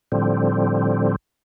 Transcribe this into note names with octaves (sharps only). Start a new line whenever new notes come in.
A2 D3 F3 G3 C4